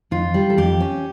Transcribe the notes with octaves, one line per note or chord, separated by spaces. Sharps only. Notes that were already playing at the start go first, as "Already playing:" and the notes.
F2 F4
G3
A4
F2 G4
C#4